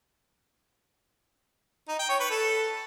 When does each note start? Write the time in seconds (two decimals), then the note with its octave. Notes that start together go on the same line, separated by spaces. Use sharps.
1.89 D#4
1.99 G5
2.10 C#5
2.20 B4
2.31 A4